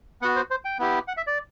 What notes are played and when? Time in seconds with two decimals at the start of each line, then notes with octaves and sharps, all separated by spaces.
0.22 B3 F#4 F#5
0.36 C5
0.51 C5
0.65 G5
0.79 B3 E4 G4
1.08 F#5
1.17 E5
1.27 D5